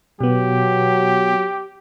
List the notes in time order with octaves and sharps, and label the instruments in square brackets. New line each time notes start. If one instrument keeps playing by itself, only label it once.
[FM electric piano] B2 B3 [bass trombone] F#3 [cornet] G4